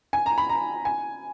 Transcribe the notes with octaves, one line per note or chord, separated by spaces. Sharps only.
G#5
A#5
B5
A#5
G#5